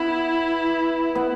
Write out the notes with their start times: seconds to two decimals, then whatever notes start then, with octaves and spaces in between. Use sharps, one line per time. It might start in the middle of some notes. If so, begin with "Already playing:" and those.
Already playing: B3 E4
1.15 B3